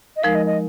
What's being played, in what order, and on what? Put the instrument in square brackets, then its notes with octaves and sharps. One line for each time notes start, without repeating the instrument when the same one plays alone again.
[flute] D#5
[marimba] F3 G#3 D#4 A#4 [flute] F5
[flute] D#5
D#5